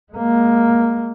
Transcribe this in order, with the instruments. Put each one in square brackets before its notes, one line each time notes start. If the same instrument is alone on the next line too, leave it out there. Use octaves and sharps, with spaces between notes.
[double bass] G#3 A#3